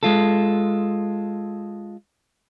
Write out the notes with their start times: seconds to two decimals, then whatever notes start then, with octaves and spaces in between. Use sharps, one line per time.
0.03 G#3 F4 A4